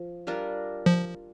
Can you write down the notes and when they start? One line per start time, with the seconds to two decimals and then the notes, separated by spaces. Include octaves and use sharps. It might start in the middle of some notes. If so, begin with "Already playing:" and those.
Already playing: F3
0.27 G3 D4 F4 A#4
0.86 F3